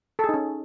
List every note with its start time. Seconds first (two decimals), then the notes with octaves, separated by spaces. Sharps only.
0.19 A4
0.24 G#4
0.29 D#4
0.34 C#4